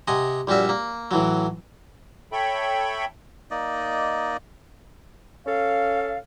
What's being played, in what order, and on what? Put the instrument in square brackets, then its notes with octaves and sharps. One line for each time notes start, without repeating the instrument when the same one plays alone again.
[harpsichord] C3 D#5 F#5 G#5
A#1 G3 C#4 F#4 E5
A#3
A2 E3 F#3
[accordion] A4 C#5 E5 G5 B5
[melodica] A#3 D#4 D5 D#5
[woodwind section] C#4 A4 F5